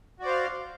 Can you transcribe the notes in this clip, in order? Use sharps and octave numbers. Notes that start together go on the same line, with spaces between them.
F#4 C5 D5 F5